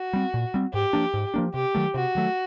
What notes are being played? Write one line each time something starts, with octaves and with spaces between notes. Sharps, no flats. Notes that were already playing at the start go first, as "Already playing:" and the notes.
Already playing: F#4
G3 C4
A#2
G3 C4
G#2 G4
F3 A#3 D4
G#2
F3 A#3 D4
C3 G4
D#3 F#3 A3
C3 F#4
D#3 F#3 A3